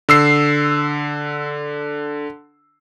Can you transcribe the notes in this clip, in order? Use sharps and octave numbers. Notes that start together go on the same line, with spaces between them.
D3 E6 C7